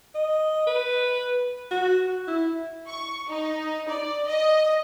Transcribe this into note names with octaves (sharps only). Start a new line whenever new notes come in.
D#5
B4
F#4
E4
C#6
D#4
D5
D#5